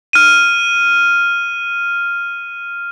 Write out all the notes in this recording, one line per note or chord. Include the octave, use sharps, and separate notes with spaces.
F6 D#7